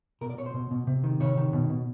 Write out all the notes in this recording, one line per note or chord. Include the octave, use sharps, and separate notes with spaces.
B2 A#4
D5
B2 C#5
C5
B2
B2
C3
D#3
C3 C#5
D#3
B2
B2